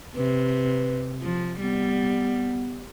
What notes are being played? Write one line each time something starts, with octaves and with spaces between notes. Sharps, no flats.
C3 B4
F3
G3 B3